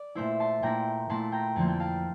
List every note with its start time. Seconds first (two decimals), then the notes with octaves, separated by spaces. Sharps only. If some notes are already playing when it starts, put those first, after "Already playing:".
Already playing: D5
0.15 A#2 A3 E4 C5 E5
0.40 A5 C6
0.62 A#2 A3 E4 G5 A#5
1.10 A#2 A3 E4 A5 C6
1.32 G5 A#5
1.56 F2 D3 F3 A#3 A5
1.68 G5
1.80 F5 A5